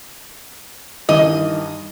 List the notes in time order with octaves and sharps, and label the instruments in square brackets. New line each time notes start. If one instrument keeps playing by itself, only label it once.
[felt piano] G2 D#3 E3 [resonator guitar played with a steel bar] D#5